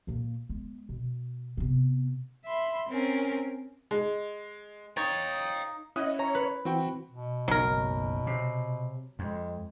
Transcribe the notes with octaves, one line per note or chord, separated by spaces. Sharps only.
A#2 A#3
G#3 B3
B2
C3 B3
E5 B5 C6
C4 C#4 A#4
G#3
D#4 C#5 F5 G5 A6
C#4 E4 D#5 F#5
C#5 A#5
B4
E3 C4 F#4 G5
B2
F#1 B1 F#3 A#4
C3
F2 G#3